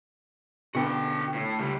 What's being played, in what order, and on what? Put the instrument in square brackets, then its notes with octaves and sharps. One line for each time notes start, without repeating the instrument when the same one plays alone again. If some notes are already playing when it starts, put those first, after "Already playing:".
[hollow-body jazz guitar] B2 D3 B3 [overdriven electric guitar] F#4 G5
[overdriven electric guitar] A2
[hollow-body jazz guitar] C#2 [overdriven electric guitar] D3 G3